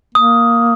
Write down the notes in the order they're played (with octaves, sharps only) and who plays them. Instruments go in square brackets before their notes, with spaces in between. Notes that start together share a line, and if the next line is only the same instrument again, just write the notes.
[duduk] A#3 [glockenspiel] D#6